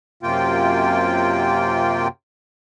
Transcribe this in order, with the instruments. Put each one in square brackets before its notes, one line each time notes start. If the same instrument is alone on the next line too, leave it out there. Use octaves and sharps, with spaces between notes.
[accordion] F#2 C3 A#3 F4 G5